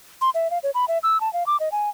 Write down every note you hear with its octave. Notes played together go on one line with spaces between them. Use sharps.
C6
E5
F5
C#5
B5
E5
E6
A5
F5
D6
D#5
G#5